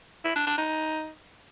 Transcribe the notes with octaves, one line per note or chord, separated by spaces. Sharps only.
E4
D4
D4
D#4